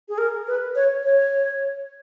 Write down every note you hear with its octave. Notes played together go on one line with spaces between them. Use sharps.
G#4
A#4
B4
C#5
C#5